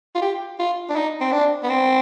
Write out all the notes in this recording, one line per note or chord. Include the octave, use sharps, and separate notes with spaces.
F4
G4
F4
D4
D#4
C4
D4
B3
C4